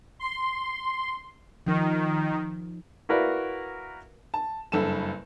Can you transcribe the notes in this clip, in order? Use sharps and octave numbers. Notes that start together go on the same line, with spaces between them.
C6
D#3 F3 D#4
E4 F#4 A#4 B4 D5 F5
A5
F#1 G2 A4 E7